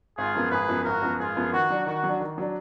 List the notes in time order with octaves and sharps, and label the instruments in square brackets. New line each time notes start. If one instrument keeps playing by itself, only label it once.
[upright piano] G#1 [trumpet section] F4 G#4
[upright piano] F#2 F3 B3
[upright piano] G#1 [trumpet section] G#4 B4
[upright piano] F#2 F3 B3
[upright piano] G#1 [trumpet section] F#4 A#4
[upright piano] F#2 F3 B3
[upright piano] G#1 [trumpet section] F4 G#4
[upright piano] F#2 F3 B3
[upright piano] D#3 [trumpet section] F#4
[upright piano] F#3 D4
[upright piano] D#3 [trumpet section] F#4
[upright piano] F#3
D4
D#3
F#3 D4